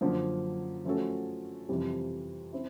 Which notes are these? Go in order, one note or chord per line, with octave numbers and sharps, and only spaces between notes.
F#2 D3 F3 A#3
F3 A3 C#4 F#4 A4
F2 C3 E3 G3
C4 E4